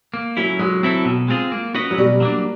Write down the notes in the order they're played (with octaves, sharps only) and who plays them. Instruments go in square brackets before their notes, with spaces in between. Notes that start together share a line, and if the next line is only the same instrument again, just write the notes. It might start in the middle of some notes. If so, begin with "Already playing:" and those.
[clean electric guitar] A#3
[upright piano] F#3 [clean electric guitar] C#4 E4
[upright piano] F#3 [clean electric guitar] G#3
[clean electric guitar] C4 E4 A4
B2
G#3 C4 F4 G#4
A#3
C#4 F#4 B4 D#5
[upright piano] F#3
[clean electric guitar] B2 [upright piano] G3
[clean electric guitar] F#3 A#3 D4